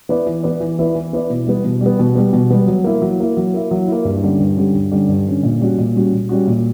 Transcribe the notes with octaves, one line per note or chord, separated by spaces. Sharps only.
B3 E4 B4 D5
E3
B3 E4 B4 D5
E3
B3 E4 B4 D5
E3
B3 E4 B4 D5
B2
G3 B3
B2
G3 B3
B2
G3 B3
B2
G3 B3
F#3
A#3 E4
F#3
A#3 E4
F#3
A#3 E4
F#3
A#3 E4
G2
D3 G3 C#4
G2
D3 G3 C#4
G2
D3 G3 C#4
G2
D3 G3 C#4
A#2
G3 C#4 F#4
A#2
G3 C#4 F#4
A#2
G3 C#4 F#4
A#2